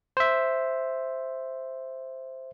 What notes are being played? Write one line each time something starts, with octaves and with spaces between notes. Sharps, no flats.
C5 E5